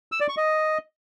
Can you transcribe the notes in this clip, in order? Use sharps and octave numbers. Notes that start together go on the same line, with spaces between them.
E6
D5
C#6
D#5